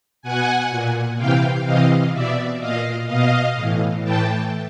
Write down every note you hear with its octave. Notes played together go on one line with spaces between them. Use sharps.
B2 F#5 G#5
A#2
C3 E3 F5 G5
C3 E3 D#5 F5
B2 D5 E5
A#2 D#5 F5
B2 D#5 F5
A2 E3
A2 E3 G5 A5